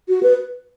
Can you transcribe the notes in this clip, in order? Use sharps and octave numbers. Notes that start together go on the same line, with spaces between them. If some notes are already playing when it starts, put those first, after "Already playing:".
F#4
B4